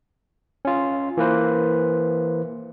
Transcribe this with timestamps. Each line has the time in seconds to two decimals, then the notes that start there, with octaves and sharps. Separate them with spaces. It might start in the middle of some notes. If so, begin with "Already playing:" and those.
0.65 C#4 F4
1.17 E3 A#3 B4 C5